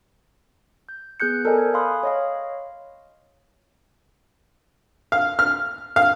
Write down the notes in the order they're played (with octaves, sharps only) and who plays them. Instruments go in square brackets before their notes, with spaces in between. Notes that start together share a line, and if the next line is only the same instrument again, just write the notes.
[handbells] G6
B3 G#4 F#6 G6 C#7
A4 A#4 C5 D5 D#5 G#5
G#6
F5 G#5 B5 C6 D#6 F#6
C#5 D#5 F5
[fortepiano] F5
F6
F5